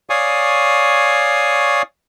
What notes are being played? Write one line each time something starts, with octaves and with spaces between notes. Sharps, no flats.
C#5 D5 F5 G#5 C#6 D#6